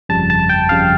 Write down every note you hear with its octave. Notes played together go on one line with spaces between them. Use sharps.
G1 F2 C#3 G3 A5
A5
G5
G1 F2 C#3 G3 F5